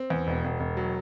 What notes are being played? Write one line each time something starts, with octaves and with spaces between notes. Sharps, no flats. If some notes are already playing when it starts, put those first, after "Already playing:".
Already playing: C4
E2
E1
E1
E1
F#3